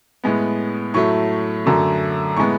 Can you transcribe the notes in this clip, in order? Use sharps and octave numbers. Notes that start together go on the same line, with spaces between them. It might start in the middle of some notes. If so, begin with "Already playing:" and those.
A2 G#3 B3
A2 F#3 A3 C#6
F#2 D3 F#3 A3
A2 G#3 B3 C#6